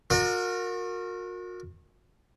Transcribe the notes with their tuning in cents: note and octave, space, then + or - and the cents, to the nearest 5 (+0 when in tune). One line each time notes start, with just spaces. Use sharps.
F#4 -40 A#4 -15 D5 +30